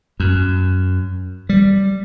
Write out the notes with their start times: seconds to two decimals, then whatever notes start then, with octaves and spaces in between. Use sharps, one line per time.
0.20 F#2
1.49 G3